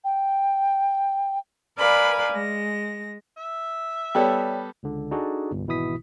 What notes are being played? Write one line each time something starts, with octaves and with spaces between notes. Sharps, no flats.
G5
A#4 B4 D5 F5 G#5 B5
G#3 A#6
E5
G3 B3 A4 C#5 D5 G5
C#2 D3
D4 D#4 F#4 G#4 A4
G1 C2
G#1 B2 E3 E4 D#6 B6